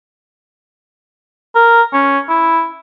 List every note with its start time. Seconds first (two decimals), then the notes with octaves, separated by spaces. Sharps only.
1.55 A#4
1.93 C#4
2.29 E4